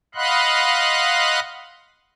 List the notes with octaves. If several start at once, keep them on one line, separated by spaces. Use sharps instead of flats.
D#5 F5 F#5 B5 C6 F#6